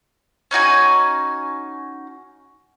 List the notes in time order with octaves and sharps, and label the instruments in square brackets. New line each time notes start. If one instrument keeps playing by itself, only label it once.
[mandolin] C#4 D#4 F#4 G#5